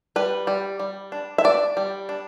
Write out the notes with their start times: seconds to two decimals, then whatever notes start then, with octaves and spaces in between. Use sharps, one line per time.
0.16 G3 B4
0.47 G3
0.79 G3
1.12 D4
1.38 E5
1.44 D4 D5
1.77 G3
2.09 D4